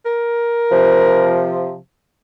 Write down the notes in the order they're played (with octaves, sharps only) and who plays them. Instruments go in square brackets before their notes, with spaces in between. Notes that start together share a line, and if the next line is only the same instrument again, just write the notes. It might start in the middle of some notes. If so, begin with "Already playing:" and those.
[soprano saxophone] A#4
[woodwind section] C3 F3